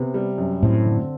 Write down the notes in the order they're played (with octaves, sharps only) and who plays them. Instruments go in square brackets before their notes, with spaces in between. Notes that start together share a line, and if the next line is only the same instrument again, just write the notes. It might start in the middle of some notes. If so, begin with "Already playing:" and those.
Already playing: [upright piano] C3 B3
G3
F#2
[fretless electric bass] A2 [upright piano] C4
[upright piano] D3